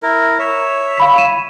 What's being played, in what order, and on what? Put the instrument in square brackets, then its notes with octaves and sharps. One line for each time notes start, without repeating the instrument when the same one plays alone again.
[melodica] E4 A#4
C#5 E5
[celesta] F5 B5 B6
D#7 E7